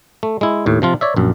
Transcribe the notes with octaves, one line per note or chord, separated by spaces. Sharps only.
A3
G#3 E4
D#2 A2
C3 F3 F4
C#5 D5 E5
A#1 F#2